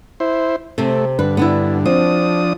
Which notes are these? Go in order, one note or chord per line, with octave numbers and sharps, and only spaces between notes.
E4 C5
C3 A3 C4
G2 D3 B4
B3 D4 E4
F3 C4 D4 D#6